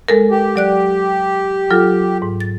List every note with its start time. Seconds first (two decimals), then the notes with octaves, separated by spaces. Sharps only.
0.09 G#3 A4 A#4
0.31 G4
0.56 F#3 D5 F#6
1.71 F#3 F4 A4
2.22 G#2
2.40 A6